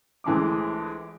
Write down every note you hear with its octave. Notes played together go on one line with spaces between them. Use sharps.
A#1 E3 G#3 A3 D6